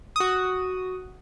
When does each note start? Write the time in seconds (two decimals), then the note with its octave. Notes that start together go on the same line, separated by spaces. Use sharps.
0.16 F#4 D#6